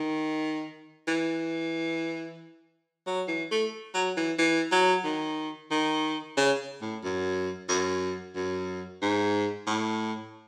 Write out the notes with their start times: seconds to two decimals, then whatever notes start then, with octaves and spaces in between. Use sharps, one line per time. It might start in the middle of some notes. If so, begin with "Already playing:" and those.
Already playing: D#3
1.08 E3
3.07 F#3
3.28 E3
3.51 A3
3.95 F#3
4.17 E3
4.39 E3
4.72 F#3
5.04 D#3
5.71 D#3
6.37 C#3
6.82 A2
7.03 F#2
7.69 F#2
8.36 F#2
9.02 G#2
9.67 A2